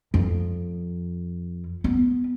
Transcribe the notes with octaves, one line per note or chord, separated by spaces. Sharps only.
F2
B3